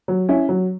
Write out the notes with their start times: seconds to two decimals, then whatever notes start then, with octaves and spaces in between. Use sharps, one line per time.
0.08 F#3
0.29 C#4 E4
0.49 F#3